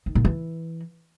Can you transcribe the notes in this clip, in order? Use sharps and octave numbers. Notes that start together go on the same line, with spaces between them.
D#3
A#2
E3